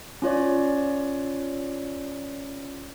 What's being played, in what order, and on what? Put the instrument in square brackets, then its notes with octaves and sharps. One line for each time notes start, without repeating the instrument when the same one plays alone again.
[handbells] C#4 F4 C#5 D5